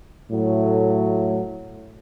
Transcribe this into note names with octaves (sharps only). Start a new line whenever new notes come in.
A2 F#3 A3